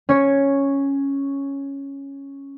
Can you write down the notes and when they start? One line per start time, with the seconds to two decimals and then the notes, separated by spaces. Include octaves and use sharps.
0.09 C#4 C#5